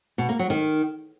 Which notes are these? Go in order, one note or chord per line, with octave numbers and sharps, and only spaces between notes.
B2
A#3
F#3
D#3